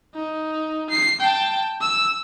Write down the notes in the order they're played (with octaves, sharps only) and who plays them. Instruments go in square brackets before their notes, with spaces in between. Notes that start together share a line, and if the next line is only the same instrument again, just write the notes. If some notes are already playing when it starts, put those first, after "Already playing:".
[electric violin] D#4
C7
G5 A5
E6